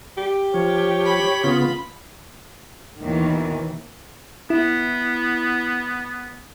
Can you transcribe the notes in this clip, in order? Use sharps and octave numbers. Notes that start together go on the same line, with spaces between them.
G4
F3 C#5
B5
C#3 B3 F4
D#2 B2 D#3 E3
B3 E4